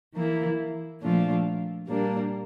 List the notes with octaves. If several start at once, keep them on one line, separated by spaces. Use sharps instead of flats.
E3 A#3 E4
A#2 F3 A3 D4 F4
A#2 G3 A#3 D4